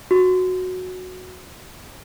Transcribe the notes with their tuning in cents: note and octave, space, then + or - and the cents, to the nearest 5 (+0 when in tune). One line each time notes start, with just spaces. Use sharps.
F#4 -10